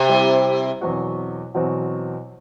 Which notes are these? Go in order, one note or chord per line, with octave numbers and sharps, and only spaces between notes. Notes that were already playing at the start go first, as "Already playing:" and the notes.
Already playing: C3
G3 C4 E4
E2 B2 F#3 C4 F#4
E2 B2 F#3 C4 F#4